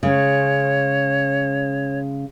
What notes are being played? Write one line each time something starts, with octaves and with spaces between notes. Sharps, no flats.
C#3 G#3 C#5